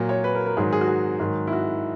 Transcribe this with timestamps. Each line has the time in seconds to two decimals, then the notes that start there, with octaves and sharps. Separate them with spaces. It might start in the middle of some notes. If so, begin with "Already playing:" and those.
Already playing: A#2 F#3
0.09 C#5
0.24 B4
0.35 A#4
0.46 A#4
0.57 G#2 D#3 F#3 G#4
0.73 G#4
0.81 F#4
0.88 G#4
1.20 G#2 D#3 F#3
1.47 E4
1.52 F#4